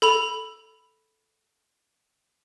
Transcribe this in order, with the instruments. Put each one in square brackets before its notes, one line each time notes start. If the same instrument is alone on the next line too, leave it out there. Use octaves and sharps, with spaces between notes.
[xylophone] A4 B5 F7